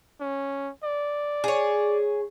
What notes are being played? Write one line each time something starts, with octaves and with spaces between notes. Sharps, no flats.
C#4
D5
G#4 C#5